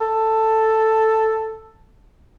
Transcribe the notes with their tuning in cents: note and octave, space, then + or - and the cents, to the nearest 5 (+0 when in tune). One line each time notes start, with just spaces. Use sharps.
A4 +5